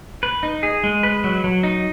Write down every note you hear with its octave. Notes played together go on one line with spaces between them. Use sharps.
B4
D#4
G#4
G#3
B4
F#3
F#3
D#4